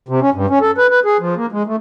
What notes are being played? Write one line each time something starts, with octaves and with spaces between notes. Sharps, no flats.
C3
C#4
G2
C#4
A4
B4
B4
G#4
F3
A#3
G#3
A3